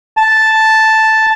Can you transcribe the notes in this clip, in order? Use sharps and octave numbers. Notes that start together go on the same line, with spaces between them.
A5